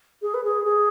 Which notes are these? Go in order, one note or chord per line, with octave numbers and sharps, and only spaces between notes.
G#4
B4
G#4
G#4